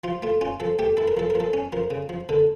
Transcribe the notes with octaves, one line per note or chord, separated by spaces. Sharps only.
F3 F4
A3 F4
C#4 F4
F3 A4
A3 G4
E4 A4
A#4
F3 A4
A#4
F3
A4
C#4
F3 A#4
C#3
F3
D3 A4